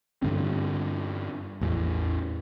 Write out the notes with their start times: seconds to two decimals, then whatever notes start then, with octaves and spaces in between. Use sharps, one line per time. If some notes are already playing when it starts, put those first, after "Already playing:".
0.22 G2 D3 C4
1.61 A1 E2